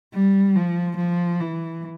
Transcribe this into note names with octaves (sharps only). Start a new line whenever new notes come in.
G3
F3
F3
E3